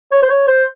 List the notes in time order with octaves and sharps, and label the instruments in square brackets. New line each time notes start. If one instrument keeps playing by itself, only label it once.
[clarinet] C#5
C5
C#5
C5